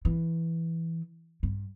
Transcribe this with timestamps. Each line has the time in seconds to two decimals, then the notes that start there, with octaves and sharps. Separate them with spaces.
0.05 E3
1.43 G2